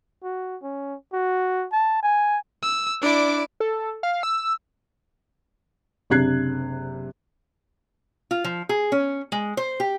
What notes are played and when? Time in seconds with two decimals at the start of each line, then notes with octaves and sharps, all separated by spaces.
0.23 F#4
0.63 C#4
1.13 F#4
1.72 A5
2.03 G#5
2.63 E6
3.02 D4 E4 D5 D6
3.60 A4
4.03 F5
4.23 E6
6.10 F#1 C3 D4 F#6 G#6 C7
8.31 F4
8.44 F3
8.69 G#4
8.92 C#4
9.32 G#3
9.57 C5
9.80 G4